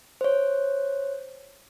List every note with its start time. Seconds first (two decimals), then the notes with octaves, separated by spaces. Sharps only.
0.21 C5 C#5